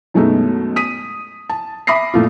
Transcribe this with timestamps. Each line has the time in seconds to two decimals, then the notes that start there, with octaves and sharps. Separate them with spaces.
0.14 F#2 B2 G#3 A3 D#4
0.76 D#6 B6 D#7
1.50 A5
1.87 E5 B5 D6 D#6 A#6 C7
2.14 A#2 A3 F4